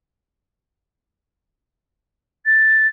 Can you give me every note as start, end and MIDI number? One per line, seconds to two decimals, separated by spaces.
2.45 2.86 93